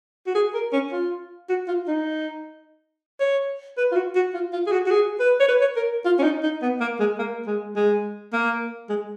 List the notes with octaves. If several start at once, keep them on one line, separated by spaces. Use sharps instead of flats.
F#4
G#4
A#4
C#4
F4
F#4
F4
D#4
C#5
B4
F4
F#4
F#4
F4
F4
G#4
F#4
F#4
G#4
B4
C#5
B4
C#5
A#4
F4
C#4
D#4
D#4
B3
A#3
G#3
A#3
G#3
G#3
A#3
G#3